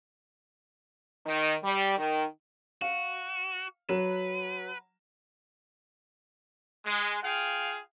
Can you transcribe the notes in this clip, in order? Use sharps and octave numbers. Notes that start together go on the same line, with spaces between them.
D#3
G3
D#3
F#4 F5
F#3 B4 E7
G#3
F4 G#4 F5 G5